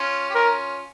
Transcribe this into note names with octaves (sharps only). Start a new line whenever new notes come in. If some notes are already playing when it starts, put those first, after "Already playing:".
Already playing: C#4 F4
G4
C#4 F4 A#4